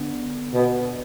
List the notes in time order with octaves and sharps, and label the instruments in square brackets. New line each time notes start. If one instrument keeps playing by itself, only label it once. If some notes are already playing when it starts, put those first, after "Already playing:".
Already playing: [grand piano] D3 B3
[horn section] B2